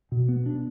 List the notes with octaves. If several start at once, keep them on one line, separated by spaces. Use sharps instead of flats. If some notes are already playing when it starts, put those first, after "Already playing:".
B2
B3
D4